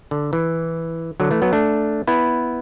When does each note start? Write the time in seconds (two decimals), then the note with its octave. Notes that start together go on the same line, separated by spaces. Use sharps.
0.11 D3
0.33 E3
1.20 D3 F#3
1.31 E3 A3
1.42 F#3 B3
1.53 A3 D4
2.07 B3 E4